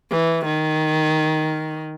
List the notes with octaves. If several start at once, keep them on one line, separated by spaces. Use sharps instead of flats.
E3
D#3